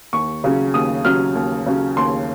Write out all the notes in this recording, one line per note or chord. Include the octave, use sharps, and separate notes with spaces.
D#2 C#6
C#3 F#3 C#4
D#2 D#6
C#3 F#3 C#4 F6
D#2
C#3 F#3 C#4
D#2 C6